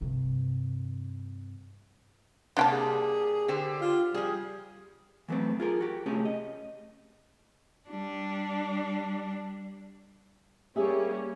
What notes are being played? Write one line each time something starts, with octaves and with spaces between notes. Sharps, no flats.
G2 C3
C3 G3 A#3 D4 G5 A5
G#4
D3 G4 C5
F4
F3 G3 G#4
E3 F#3 A3 B3 C4
F4 G#4 A#4
F#4 G4
C3 A3 C#4 G4 G#4 C#5
D#5
G3 D4
G3 A#3 C#4 G4 G#4 E5